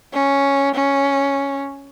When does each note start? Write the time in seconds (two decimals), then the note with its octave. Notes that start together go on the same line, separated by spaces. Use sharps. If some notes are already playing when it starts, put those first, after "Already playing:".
0.14 C#4
0.75 C#4